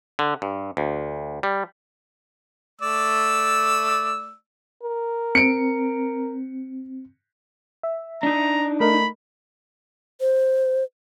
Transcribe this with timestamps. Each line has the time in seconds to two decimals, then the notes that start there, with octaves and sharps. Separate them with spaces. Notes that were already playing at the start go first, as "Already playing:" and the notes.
0.19 D3
0.42 G2
0.77 D2
1.43 G3
2.81 A3 D5 E6
4.83 A#4
5.35 C4 C#7 D7
7.83 E5
8.23 D4 D#4 A#5
8.80 A3 A#4 D#5 B5
10.21 C5